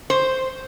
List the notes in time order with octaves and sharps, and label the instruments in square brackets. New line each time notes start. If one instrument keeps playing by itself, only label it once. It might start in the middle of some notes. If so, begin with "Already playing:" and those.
[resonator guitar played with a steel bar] C5